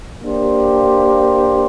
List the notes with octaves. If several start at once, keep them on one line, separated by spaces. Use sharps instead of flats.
A#3 D4 G4 C5